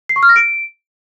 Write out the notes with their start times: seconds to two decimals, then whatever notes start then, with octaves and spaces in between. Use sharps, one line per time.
0.09 C7
0.16 C#6
0.23 F6
0.29 A#6
0.36 D7